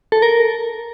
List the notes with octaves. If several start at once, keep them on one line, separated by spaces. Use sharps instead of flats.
A4
A#4